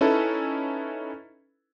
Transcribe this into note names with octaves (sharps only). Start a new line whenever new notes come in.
C#4 D#4 E4 A4 B4